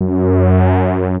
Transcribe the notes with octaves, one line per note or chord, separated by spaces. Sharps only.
F#2